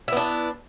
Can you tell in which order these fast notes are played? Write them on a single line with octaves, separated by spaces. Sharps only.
E4 B3 D4